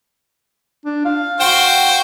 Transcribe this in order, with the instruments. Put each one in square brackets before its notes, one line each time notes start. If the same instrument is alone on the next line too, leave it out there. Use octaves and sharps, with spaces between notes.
[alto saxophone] D4
F5
[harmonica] F#4 C5 G5